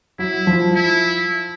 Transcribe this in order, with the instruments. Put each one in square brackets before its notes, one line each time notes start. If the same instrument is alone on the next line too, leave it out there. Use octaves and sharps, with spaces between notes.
[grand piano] F#3 [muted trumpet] E4
[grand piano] F3
[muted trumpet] E4